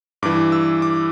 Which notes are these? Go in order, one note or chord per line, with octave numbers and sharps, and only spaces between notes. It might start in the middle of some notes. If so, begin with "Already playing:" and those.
G2 E3 D6
E6
D6